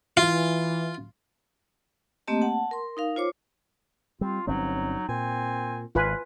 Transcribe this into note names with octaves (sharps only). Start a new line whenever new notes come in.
E3 F4
A3 A#3 C4 G4 D#5 A5
F#5 A5
A#4 C6
D#4 A#4 F5
F4 C5 C#5 D6
G3 C4 F4
G1 F#3 C4 C#4 D#4
A#2 C4 G#5
G#1 F4 B4 G#5